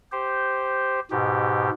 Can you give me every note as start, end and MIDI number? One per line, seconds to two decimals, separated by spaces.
0.12 1.00 67
0.12 1.00 72
1.11 1.70 44
1.11 1.70 47
1.11 1.70 67